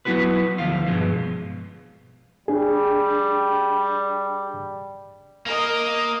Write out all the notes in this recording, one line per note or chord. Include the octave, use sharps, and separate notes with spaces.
F#3 B3 E4 F#4 B4
D2 F3 F4
G2 B2 F3 G#3
G3 D4 G#4
A#3 A#4 D#5